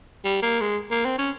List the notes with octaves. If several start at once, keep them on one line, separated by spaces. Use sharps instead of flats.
G3
A#3
G#3
A#3
C4
C#4